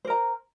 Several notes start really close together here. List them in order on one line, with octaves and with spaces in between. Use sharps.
C5 A#4 A#5